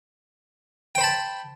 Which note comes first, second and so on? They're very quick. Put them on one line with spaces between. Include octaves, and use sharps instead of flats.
G5 C5 B5 A5